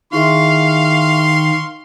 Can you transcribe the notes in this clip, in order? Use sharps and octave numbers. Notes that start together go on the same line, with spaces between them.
D#3 E4 G#4 E5 F5 C6 C#6